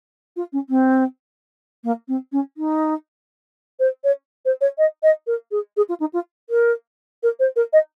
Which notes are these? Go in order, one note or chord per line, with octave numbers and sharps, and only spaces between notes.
F4
C#4
C4
A#3
C4
C#4
D#4
C5
C#5
C5
C#5
D#5
D#5
A#4
G#4
G#4
F4
D#4
F4
A#4
A#4
C5
A#4
D#5